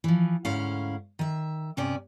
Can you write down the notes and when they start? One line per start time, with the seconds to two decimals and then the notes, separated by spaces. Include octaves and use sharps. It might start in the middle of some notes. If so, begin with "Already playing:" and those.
0.04 E3 F3
0.45 D2 G#2 C#4 E4 F5
1.19 D#3 E5
1.77 G2 C3 B3 C#4 D5